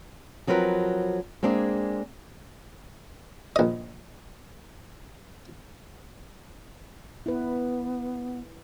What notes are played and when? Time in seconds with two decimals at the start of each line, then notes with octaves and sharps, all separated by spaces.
0.47 F3 F#3 C4 A#4 B4
1.43 G#3 A#3 C4 D4 G#4
3.56 A#1 D#5
7.26 B3 E4 B4